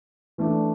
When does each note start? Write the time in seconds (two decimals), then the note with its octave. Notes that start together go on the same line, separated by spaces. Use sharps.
0.38 E3 A3 D4